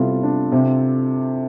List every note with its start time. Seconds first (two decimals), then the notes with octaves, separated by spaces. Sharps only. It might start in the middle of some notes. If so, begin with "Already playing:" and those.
Already playing: C3 G3 B3 E4 F4 A4
0.23 D4
0.52 C3